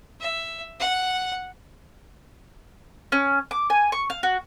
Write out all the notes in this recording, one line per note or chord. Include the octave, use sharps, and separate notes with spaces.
E5
F#5
C#4
D6
G#5
C#6
F5
F#4